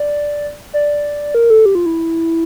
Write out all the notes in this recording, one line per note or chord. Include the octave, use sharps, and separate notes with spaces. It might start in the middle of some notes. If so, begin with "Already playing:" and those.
Already playing: D5
D5
A#4
A4
G4
F4
E4